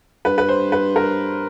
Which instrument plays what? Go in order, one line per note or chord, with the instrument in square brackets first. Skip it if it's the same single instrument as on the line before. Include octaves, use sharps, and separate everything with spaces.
[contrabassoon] G2 [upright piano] B4
[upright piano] B4
C5
B4
A#4